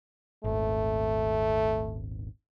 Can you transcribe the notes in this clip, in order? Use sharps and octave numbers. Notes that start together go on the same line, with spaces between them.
D#1 G#1 A3